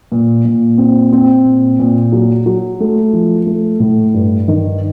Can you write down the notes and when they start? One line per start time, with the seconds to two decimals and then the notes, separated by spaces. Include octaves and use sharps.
0.12 A#2
0.45 A#2
0.78 C4
1.12 C4
1.45 A#2
1.79 A#2
2.12 F#3
2.46 F#3
2.80 A3
3.13 F3
3.46 A3
3.80 A2
4.14 G2
4.48 D#3